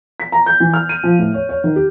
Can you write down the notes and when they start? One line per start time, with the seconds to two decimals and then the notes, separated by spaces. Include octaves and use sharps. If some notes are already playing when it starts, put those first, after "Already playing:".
0.20 B6
0.32 A#5
0.46 G6
0.60 E3
0.74 F6
0.89 D#7
1.03 F3
1.19 A2
1.34 C#5
1.49 C#5
1.64 D#3
1.76 G4